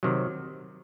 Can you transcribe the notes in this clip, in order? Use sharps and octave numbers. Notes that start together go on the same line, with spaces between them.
C3 D#3 F#3